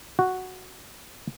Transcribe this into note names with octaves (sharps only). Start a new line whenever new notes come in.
F#4